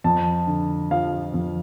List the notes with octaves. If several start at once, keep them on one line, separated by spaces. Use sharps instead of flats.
F2 A5
D3
F3 F5
F2